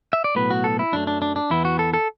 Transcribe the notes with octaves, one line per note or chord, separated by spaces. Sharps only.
E5
D5
B1 A2 F#3 B3 B4
F#4
A4
E4
F#2 F#3 A3 D4
D4
D4
D4
E2 E3 B3 E4
F#4
A4
A4